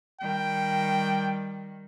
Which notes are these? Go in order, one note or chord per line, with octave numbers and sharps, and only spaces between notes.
D#3 G3 G5